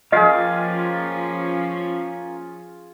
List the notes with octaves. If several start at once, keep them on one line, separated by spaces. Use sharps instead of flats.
F3 A#3 C#4 F4 G4 G#4 D#5 F5